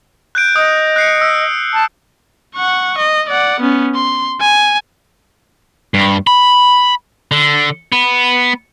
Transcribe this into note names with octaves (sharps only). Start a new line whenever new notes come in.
F#6 G6 D7
D#5 D#6
F#6 C7 C#7
E6
A5
F#5 C#6
D#5
D5 F#5
B3 C#4
C6
G#5
G2
B5
D3
B3